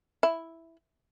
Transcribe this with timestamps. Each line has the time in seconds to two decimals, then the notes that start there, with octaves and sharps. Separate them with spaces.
0.23 E4